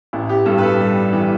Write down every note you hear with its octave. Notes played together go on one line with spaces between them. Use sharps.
A1 E4
G4
G2 A4
B4
A4
G3
E3